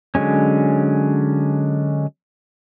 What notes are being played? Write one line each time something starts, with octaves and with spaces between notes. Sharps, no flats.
D3 F#3 G#3 C#4